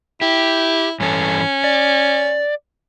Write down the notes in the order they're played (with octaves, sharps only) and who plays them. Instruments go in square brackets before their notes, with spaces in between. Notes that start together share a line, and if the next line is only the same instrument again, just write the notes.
[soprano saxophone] E4 [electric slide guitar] G4
[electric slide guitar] G2 E3 A4 [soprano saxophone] C#4
[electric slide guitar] D5